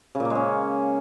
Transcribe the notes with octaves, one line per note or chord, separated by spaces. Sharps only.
C#3
A#2
A#3
G#3
C#4